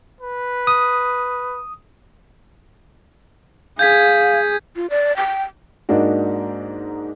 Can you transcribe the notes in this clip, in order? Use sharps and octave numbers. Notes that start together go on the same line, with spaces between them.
B4
D#6
G#4 F5 G6 G#6 B6
F4
D5
G5
G#2 A#3 D4 D#4 F#4